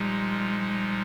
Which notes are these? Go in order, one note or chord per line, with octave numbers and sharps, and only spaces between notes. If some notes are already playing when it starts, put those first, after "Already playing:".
Already playing: A#2 F3 G3 G#3 D#4